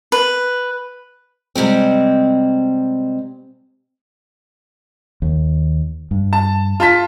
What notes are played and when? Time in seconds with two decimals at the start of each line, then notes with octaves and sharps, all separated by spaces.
0.12 B4
1.55 C3 G3 G#3 C4
5.22 D#2
6.11 G2
6.33 A5
6.80 F4 A5 B6